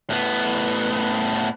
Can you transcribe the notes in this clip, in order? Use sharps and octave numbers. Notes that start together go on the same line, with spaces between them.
A2 B3